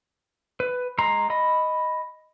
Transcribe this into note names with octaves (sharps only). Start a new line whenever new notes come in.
B4
G#3 A#5 C6
D#5 B5